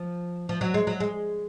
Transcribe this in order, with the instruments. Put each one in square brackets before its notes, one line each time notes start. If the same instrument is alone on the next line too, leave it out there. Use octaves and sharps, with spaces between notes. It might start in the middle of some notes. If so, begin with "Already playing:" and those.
Already playing: [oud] F3
F3
F#3
G#3
F#3
G#3